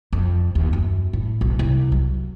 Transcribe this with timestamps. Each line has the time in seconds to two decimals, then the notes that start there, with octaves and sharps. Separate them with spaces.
0.13 F2
0.55 D#2
0.73 F#2
1.13 A2
1.41 B1
1.59 C2
1.92 F#3